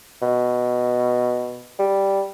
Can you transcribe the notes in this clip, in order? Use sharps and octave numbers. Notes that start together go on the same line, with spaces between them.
B2
G3